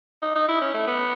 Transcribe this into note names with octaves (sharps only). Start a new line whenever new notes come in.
D#4
D#4
E4
C#4
A3
B3